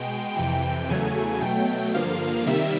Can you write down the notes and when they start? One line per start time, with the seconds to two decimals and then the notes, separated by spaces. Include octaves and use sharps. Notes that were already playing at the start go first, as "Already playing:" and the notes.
Already playing: B2 G#3 G5
0.37 F2 C3 E3 G5
0.90 E2 C#3 F#3 A3 G#5
1.41 B2 F#3 A3 G5
1.94 G2 D3 F3 A#3 F5
2.46 C3 D#3 G3 A#3 E5